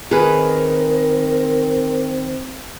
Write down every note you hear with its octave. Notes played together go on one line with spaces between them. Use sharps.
D#3 C4 G#4 A#4 B4